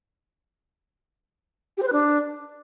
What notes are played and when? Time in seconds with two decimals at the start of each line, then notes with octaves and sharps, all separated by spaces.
1.77 G4
1.82 C5
1.87 B4
1.92 D4